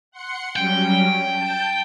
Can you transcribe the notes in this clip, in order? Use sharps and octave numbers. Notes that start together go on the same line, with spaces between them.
F#5 C6 C#7
F#3 G3 C#4 G5
A5 G6